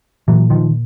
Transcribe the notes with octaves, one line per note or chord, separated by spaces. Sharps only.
A#2 E3 F#3
D#3 F3